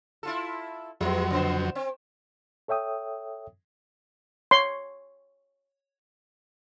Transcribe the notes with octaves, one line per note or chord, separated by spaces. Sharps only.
E4 F4 A4
F2 F#3 G3 B3
C#3 B3 C5
C4
A4 C#5 E5 G5 D#6
C#5 C6